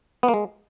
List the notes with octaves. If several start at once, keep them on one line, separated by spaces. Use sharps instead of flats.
B3
A#3
G#3